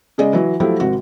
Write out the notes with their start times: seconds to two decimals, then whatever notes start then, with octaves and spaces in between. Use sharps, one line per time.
0.18 C#3 G#3 G#4 D5 D#5
0.33 E3 F#3
0.60 F3 F#3 A3 E4 G4
0.80 G#1 C3 F#4